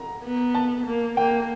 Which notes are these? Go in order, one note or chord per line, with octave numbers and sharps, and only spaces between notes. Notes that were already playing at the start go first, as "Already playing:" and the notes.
Already playing: A#5
B3
A5
A#3
A#3 G5